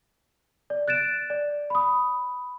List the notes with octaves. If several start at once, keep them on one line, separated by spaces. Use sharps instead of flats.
D5
F#6 A6 D7 E7
D5
B5 D#6